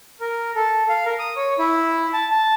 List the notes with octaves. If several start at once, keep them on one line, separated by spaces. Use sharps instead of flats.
A#4
A4
F5
A#4
D#6
C#5
E4
A5
A5